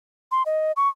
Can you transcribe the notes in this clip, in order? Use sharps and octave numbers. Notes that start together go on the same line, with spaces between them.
C6
D#5
C#6